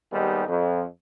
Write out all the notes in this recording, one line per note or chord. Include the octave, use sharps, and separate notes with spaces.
D#2 G3 G#3 B3 D#4
F2